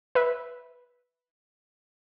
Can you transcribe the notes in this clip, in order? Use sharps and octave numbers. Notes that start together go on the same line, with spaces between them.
B4 E5